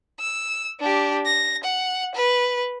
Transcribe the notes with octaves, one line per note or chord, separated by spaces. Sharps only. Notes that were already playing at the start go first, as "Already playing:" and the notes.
E6
D4 G4
A#6
F#5
B4